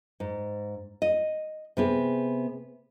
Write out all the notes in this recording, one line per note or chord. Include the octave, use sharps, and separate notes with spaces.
G#2
D#5
C3 B3 G#4